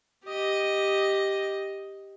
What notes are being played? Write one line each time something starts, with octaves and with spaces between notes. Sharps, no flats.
G4 D#5